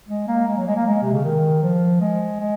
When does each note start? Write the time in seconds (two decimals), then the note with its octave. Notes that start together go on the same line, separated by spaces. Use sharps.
0.09 G#3
0.28 A#3
0.48 G#3
0.57 F#3
0.66 G#3
0.76 A#3
0.86 G#3
1.02 C3
1.13 C#3
1.24 D#3
1.63 F3
2.01 G#3
2.40 G#3